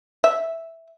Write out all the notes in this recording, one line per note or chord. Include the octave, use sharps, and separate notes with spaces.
E5